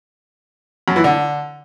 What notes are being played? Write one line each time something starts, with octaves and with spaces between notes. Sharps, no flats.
F#2
E3
D3